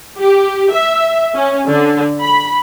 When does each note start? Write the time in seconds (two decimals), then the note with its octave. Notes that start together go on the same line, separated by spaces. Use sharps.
0.19 G4
0.73 E5
1.35 C#4
1.69 D3
2.21 B5